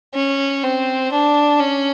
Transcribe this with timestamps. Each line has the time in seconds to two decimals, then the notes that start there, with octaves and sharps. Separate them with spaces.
0.14 C#4
0.63 C4
1.12 D4
1.60 C#4